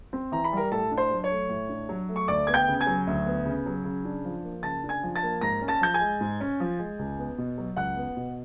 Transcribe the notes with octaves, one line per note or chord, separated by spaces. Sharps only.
C4
E3 A#5
B5
G3 A#4 A#5
A2 A4 A5
D4
C5 C6
F#3
C#5 C#6
A3
A2
D4
F#3
A3
C#6
D2 D5 D6
B3 G#6
G5 G6
C#3
G#5 G#6
F#3
D2
B3
C#3
F#3
C#3
D4
F3
A#3
C#3 A5 A6
D4
G#5 G#6
F3
A5 A6
A#3
G#2 A#5 A#6
C#4
A5 A6
F3 G6
G#5 G#6
G#3
G#2
C#4
F3
G#3
C#2
B3
B2
F#3
C#2 F#5 F#6
B3
B2